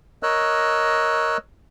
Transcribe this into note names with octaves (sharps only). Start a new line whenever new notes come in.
A#4 C#5 D#5 E6 F#6